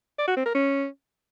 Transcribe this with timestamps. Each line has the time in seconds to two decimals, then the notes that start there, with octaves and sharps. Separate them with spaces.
0.19 D5
0.28 F#4
0.37 C4
0.46 A#4
0.55 C#4